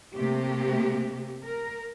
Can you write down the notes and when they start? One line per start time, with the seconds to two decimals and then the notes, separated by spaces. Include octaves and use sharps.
0.16 C3 A3 A#3 G4
1.43 A#4